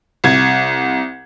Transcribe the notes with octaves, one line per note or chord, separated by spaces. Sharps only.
C2 G#6